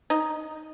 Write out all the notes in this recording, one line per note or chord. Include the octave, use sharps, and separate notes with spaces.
D#4